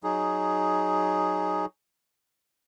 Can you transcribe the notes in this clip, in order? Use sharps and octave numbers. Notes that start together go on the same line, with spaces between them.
F#3 D#4 G#4